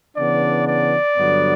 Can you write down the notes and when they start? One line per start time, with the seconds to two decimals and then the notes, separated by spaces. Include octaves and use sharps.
0.16 C#3 E3 B3 D4 D5
0.66 D5
1.17 G2 D3 F#3 B3